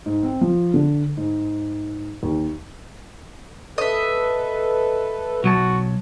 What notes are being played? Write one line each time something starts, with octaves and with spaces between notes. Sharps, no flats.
G#2
C4
F3
D3
G#2
D#2
A4 B4 D#5 E5
B1 F#3 F#4 A5